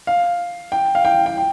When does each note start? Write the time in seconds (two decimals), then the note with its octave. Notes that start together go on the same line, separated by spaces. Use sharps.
0.07 F5
0.72 G5
0.95 F5
1.05 G5
1.26 G5
1.37 G5